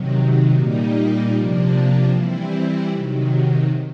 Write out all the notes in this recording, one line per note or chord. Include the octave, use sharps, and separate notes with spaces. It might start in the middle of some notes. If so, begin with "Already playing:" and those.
Already playing: C3 D#3 F#3
A#2 G3 A#3 D#4
C3 F3 A#3 D4
E3 G3 C4 E4
C3 D#3 F#3